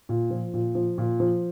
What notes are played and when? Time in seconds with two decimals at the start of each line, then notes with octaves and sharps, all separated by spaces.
0.09 A#2
0.30 F3
0.54 A#2
0.75 F3
0.98 A#2
1.20 F3